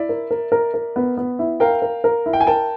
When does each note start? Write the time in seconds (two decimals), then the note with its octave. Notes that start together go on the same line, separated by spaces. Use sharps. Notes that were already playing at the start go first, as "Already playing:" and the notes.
Already playing: E4 D5 E5
0.09 A#4
0.31 A#4
0.52 A#4
0.74 A#4
0.96 B3
1.17 B3
1.39 E4
1.60 A#4 F5 G5
1.82 A#4
2.04 A#4
2.26 E4
2.33 G5
2.41 G#5
2.47 A#4 G5 A5